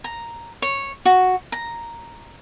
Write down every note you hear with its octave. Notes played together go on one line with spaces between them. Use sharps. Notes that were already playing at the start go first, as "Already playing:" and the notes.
A#5
C#5
F#4
A#5